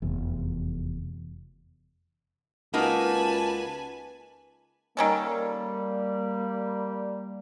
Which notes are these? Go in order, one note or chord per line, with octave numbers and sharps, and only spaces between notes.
F1 E2
C#2 A#3 D#4 F#4 B4 G#5 A5
D#3 G3 A#3 C#4 A4